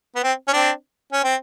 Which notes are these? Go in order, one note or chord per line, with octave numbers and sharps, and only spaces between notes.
B3
C4
C#4
C4 D4
C#4
C4